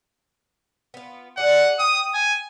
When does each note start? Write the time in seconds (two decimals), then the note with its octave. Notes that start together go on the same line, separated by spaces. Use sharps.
0.94 B3 F4
1.38 G#4 D5 F#5
1.79 G5 D#6
2.14 G#5